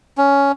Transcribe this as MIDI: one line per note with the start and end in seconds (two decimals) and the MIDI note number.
0.18 0.52 61